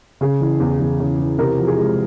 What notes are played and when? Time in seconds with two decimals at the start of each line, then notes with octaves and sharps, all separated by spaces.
0.21 C#3 G#4
0.41 E3
0.60 E2
0.80 E2
1.00 C#3
1.19 E3
1.38 C3 A#4
1.58 F3
1.67 G#4
1.77 G#3